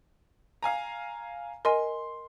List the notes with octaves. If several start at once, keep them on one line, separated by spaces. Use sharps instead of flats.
F5 G#5 A#5
A#4 D#5 G#5 C6